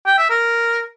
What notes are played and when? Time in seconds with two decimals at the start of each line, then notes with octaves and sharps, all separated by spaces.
0.07 G5
0.18 E5
0.30 A#4